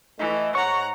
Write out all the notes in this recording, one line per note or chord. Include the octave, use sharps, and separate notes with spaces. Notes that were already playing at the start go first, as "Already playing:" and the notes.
E3 A3 D#5
G#2 C#5 F#5 A#5 C#6